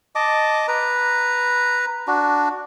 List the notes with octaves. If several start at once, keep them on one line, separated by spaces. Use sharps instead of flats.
D#5 A5 D6
B4 A#5
D4 F#4